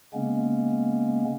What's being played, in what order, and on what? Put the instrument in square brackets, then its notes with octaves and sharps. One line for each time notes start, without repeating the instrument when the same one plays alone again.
[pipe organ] C#3 G#3 A#3 B3 C#4